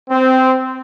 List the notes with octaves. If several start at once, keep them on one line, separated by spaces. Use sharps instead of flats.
C4